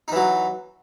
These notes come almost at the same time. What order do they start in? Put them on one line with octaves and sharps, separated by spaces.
D#4 E3 F#3